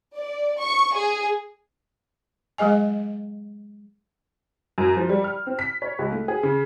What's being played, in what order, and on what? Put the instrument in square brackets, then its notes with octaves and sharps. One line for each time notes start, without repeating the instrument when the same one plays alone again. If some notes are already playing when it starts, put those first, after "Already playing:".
[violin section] D5
C#6
G#4
[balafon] F#3 G#3 G#4 D#5 G#5
[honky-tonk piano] F#2
F3
G3
F6
C4
B6
C#5
C#2
A3
G#4
C#3